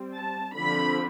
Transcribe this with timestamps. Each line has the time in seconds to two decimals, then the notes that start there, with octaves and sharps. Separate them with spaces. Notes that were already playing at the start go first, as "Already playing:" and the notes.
Already playing: G3 C4
0.13 A5
0.54 D3 F3 C4 B5